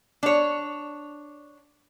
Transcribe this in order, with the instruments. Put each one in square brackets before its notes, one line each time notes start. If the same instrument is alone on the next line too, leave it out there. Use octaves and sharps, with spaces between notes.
[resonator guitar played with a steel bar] D4 C#5